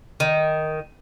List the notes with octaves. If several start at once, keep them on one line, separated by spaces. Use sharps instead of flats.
D#3